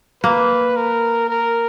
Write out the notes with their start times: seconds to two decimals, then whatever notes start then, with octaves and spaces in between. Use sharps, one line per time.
0.23 A#3 B4
0.76 A#4
1.29 A#4